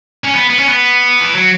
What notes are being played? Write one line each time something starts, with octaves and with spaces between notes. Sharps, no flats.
C#4
B3
B3
C#4
B3
E3
F#3